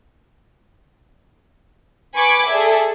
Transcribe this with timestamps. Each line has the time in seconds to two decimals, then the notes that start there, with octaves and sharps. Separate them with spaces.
2.15 B4 G#5 B5 C#6 D6 G#6
2.48 G#4 A4 D5 E5